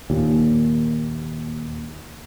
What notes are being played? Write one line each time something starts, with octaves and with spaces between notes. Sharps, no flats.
D#2 A#2